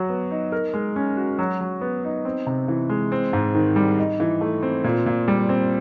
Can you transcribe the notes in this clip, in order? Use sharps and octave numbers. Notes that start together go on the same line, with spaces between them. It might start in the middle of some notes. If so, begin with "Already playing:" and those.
Already playing: F#3 F#4
B3
D#4
A#4
G#3
C#4
F#4
F#3
F#3
B3
D#4
C4
C3
E3
G#3
C4
G#2
D#3
G3
D#4
E3
A3
C4
A#2
A#2
G3
C4